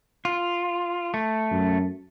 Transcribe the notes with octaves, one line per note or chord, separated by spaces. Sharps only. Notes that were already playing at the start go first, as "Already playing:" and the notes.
F4
A3
F#2